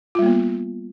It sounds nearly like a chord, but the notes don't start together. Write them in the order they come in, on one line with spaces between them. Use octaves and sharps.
F4 G3 A#3 B3